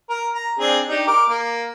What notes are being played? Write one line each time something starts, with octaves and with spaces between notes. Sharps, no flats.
A#4
A#5
C4 D4 G#4
D4 D#4 G4
A#4 D6
A#3